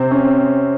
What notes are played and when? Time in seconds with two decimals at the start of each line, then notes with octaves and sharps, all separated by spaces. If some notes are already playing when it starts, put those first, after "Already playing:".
Already playing: C3 C4
0.11 C#4